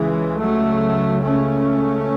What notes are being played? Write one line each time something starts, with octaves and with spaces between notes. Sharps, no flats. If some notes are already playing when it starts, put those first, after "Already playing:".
Already playing: C#2 C#3 E3 G#3
F#3 A3
A3 C#4